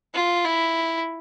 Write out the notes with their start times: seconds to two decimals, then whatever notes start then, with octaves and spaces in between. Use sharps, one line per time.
0.14 F4
0.44 E4